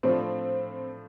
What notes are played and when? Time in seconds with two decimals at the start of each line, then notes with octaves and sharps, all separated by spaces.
0.03 A2 F3 A3 C4 D4 F4